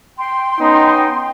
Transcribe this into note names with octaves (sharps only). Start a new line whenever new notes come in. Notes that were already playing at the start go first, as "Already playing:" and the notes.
G5 C6
B3 C#4 D#4